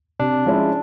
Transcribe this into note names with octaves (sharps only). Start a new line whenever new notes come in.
C3 D4
F3 G#3 C#4 E4